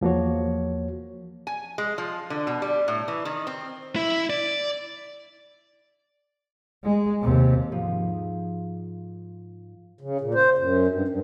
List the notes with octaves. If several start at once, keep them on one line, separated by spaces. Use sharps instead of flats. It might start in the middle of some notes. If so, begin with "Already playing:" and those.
E2 F3 A#3 F#4 C#5
G#5
G#3
F3
D3
B2
G3
A2
E3
D#3
C4
E4
D5
G#3
D#2 C3
G#2 F3
C#3
A#2
C5
F#2
G2
G2